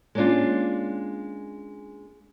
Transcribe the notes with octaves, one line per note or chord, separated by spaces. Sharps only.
G#3 A#3 C#4 D4 F4